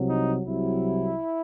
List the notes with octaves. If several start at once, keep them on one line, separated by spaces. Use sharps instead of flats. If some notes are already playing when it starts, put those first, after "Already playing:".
Already playing: C2 C3 F#3
D#4
C2 C3 F#3 E4